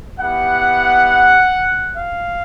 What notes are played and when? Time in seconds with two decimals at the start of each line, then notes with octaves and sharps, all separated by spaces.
0.18 B3 E4 G4 F#5
1.95 F5